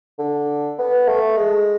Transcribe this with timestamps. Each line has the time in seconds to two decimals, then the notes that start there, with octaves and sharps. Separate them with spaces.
0.19 D3
0.78 B3
1.08 A3
1.37 G#3